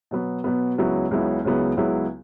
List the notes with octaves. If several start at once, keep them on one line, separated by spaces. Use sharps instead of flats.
B2 F#3 B3
B2 F#3 B3
C#2 C#3 F#3 B3 E4
C#2 C#3 F#3 B3 E4
C#2 C#3 F#3 B3 E4
C#2 C#3 F#3 B3 E4